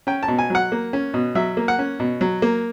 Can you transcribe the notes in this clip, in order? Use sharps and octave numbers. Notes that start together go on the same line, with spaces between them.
C#4 G5
A5
B2
G#5
F#3 F#5
A#3
C#4
B2
F#3 E5
A#3
F#5
C#4
B2
F#3
A#3